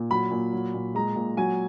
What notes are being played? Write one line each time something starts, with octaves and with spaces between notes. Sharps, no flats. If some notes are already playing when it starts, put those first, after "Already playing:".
Already playing: A#2
F#3 B5
A#2
F#3
A#2
G#3 A#5
A#2
F#3 G#5